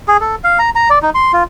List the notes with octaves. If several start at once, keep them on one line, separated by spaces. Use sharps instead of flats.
G#4
A4
F5
A#5
A#5
D5
D#4
C6
F4